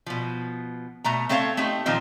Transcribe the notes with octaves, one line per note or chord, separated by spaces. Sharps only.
B2 F3
B2 A3 A#5
A3 C4 A4 C#5 F5
A3 C4 D#4 G4
A#2 D#3 F3 C4 D#4